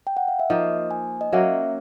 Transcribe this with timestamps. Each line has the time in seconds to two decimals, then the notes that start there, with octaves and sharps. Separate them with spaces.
0.07 G5
0.17 F#5
0.28 F5
0.39 E5
0.50 F3 A#3 D#4 D#5
0.91 G#5
1.21 D#5
1.32 F#3 A#3 C#4 E5